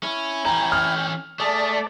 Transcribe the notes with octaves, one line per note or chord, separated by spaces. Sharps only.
C#4 E4 G#5
E3 C#4 G5 A#5
F6
A3 G#4 D5 A5